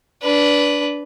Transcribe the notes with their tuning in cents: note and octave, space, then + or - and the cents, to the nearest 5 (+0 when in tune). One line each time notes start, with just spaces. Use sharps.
D4 -15 B4 +0